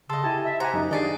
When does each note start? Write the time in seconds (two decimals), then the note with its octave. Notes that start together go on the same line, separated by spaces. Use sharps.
0.10 C#3 A4 D#5 A5 C6 E6
0.24 E4 G4 G#5 A5
0.44 E5
0.60 G4 C5 F#5 G#5 A#5
0.74 F#2 D#4
0.91 D#3 D4 G#4 D5 D#5